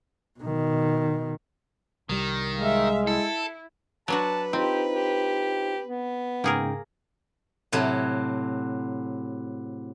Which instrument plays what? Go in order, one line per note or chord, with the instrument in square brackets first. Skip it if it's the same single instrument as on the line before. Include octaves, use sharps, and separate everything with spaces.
[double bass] B2 D#3
[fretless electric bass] C2 G3 [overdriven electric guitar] D#3
[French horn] G#3 [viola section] E5 F5
[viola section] E4 [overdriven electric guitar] A4
[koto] F#3 D4 F#4 [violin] B4 [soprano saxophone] A5
[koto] C4 [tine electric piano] D#4 F4 C5 [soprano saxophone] G4
[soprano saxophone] G4
B3
[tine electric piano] G#2 C#3 G5 [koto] A#3 G#4 A#4
[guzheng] A2 C3 F#3